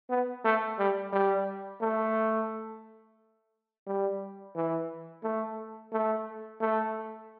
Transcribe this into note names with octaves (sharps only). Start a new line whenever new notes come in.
B3
A3
G3
G3
A3
G3
E3
A3
A3
A3